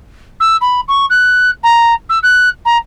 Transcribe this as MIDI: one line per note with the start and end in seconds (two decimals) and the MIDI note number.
0.40 0.57 88
0.61 0.81 83
0.88 1.06 85
1.10 1.51 90
1.64 1.94 82
2.10 2.19 88
2.23 2.49 90
2.65 2.77 82